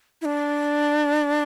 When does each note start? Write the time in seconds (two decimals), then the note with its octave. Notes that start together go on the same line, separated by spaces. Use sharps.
0.21 E4
0.25 D4